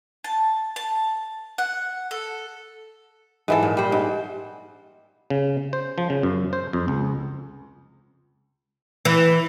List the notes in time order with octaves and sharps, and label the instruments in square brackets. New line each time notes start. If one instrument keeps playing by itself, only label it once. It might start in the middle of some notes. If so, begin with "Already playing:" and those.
[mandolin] A5
A5
F#5
A4
[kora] G#2 E3 A4
A#2
G3 C5
G#2
[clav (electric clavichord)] C#3
C5
F3
C#3
F#2
C5
F2
C#2
[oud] E3